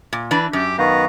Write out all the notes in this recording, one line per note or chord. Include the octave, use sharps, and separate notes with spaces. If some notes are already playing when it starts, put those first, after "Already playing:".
A#2
E3 D4 B4
F#2 G4
D#3 B3 B4 F5 A#5 C#6